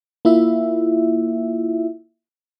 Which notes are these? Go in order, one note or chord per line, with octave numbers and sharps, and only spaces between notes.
A#3 E4 F4 E5